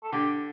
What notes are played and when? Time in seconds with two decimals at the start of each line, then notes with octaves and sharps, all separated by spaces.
0.03 A4
0.12 D3 G4